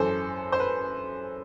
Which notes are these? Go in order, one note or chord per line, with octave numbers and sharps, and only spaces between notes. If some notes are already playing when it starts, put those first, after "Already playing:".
Already playing: F#2 E3 A4 C5
C5
B4